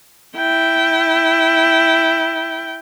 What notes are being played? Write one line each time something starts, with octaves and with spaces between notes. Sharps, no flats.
E4 G5